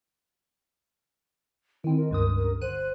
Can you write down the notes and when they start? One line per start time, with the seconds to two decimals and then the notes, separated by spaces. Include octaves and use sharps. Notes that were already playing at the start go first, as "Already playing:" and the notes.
1.84 D#3 C4 E4
1.97 A#4
2.11 C#2 G2 A#4 D#6
2.35 A#4
2.61 G1 C5 F#6 D#7